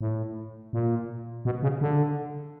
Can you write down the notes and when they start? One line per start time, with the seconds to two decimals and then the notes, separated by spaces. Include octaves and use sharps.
0.01 A2
0.73 A#2
1.45 B2
1.63 C#3
1.81 D3